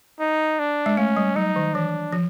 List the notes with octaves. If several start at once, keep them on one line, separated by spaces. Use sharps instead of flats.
D#4
D4
G#3
A3 C#4
G3
F#3 D#4
D#3
E3 D4
F3